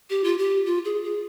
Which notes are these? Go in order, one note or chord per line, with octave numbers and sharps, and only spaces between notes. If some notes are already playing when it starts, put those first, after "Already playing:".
G4
F4
G4
F4
G#4
G#4